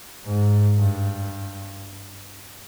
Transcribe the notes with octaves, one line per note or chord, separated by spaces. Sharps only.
G#2
G2